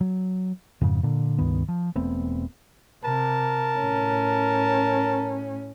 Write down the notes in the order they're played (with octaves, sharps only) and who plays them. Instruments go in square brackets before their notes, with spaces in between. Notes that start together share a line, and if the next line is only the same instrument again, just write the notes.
[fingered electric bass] F#3
F2 G#2 C#3
A#2 D3
C#2 G2 D#3 B3
F3
E1 A3 B3 C4
[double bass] C3 [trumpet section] A#4 A5
[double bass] A2 C#4